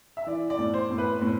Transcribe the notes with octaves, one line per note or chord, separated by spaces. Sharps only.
E5
E3 D5
D5
A2
C5
A2
B4
A2